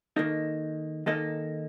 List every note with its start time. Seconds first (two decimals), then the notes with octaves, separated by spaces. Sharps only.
0.16 D#3 A#3 D#4 A4 D#5
1.06 D#3 A#3 D#4 A4 D#5